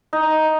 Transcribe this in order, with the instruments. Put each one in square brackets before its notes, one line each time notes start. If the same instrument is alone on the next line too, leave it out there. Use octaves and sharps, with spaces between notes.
[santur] D#4